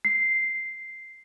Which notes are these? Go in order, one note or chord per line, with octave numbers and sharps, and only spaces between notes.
C7